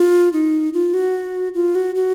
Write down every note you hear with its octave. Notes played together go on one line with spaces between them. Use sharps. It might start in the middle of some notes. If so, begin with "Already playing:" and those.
Already playing: F4
D#4
F4
F#4
F4
F#4
F#4